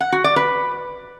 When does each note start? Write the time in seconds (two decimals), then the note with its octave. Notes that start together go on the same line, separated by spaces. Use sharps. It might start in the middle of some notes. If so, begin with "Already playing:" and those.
0.01 F#5
0.12 F#4
0.24 D5
0.36 B4